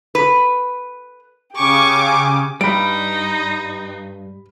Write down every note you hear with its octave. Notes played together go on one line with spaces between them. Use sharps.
B4
C#3 G4 G#5 C#6 D6
G2 G3 D#4 B5 D7